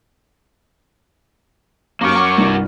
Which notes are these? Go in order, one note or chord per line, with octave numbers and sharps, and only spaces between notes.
F#2 A#3 G4 C#6 D6 F6
F#4 A#4 F#5
C2 G2